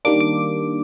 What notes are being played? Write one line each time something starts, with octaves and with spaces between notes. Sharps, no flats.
D#3 G3 A#3 D4 D6
D6